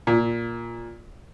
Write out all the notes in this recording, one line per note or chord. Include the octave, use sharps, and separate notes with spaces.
A#2